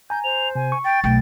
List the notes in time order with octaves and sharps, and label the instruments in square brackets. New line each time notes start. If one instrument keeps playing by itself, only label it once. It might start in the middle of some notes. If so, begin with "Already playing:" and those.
[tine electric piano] G#5 A#5 [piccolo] G6
[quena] C5 [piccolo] F7
[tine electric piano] C3 [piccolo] G#5
[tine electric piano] C#6
[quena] G5 [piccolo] A6
[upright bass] B1 A3 [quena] G5